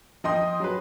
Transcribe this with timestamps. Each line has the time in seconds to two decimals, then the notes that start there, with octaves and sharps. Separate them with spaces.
0.24 F3 D#5 G5 C6 D#6
0.60 F#3 G#4 B4